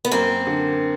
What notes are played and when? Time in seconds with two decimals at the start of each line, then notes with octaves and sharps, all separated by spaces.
0.05 B3
0.11 F#2 A#3 C4
0.46 D3